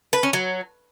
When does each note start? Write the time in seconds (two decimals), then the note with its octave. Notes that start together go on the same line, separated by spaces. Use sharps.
0.13 B4
0.23 C#4
0.33 F#3